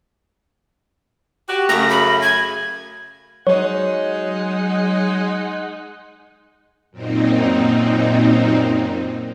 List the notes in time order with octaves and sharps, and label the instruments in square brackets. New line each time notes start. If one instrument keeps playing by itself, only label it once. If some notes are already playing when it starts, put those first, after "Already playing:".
[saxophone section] F#4 G4
[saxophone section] F#2 C#3 A3 [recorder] A#6
[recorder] B5
G#6
[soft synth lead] F#3 [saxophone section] G#3 D#4 F#5 [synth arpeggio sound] C#5
[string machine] F#2 A#2 C4 D#4